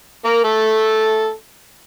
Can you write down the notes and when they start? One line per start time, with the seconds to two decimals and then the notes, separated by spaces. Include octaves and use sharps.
0.25 A#3 A#4
0.44 A3 A4